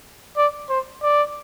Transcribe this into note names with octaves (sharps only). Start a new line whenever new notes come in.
D5
C5
D5